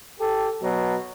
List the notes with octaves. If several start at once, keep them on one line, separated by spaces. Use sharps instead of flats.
G4 A4
B2 F#3